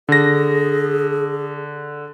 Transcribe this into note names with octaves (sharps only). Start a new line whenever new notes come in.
D3 G#4 A#6